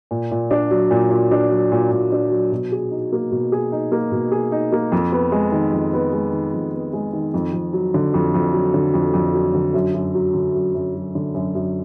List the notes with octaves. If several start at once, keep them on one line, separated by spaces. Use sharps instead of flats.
A#2
A#2
D4
F#3
A#2
A#2
D4
F#3
A#2
A#2
D4
F#3
B2
G#4
D#4
A#3
B2
G#4
D#4
A#3
B2
G#4
D#4
A#3
F2
B3
G#3
D#3
F2
B3
G#3
D#3
F2
B3
G#3
D#3
F2
F2
F#3
D3
F2
F2
F#3
D3
F2
F2
F#3
D3
F#2
F#2
F#3
D3
F#2
F#2
F#3
D3
F#2
F#2